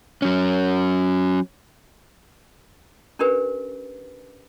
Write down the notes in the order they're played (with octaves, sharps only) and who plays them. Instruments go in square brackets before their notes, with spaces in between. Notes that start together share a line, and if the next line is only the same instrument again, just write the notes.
[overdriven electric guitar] F#3 C#4
[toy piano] C#4 D4 G4 A#4 B4